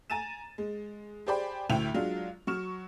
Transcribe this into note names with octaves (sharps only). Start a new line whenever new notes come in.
G#5 A#5 A6 D#7 E7
G#3
G4 G#4 C5 D5 G5 B5
D2 A2 A3 E5 G5 F7
F#3 G#3 D4 F4
F#3 C#6 F6 E7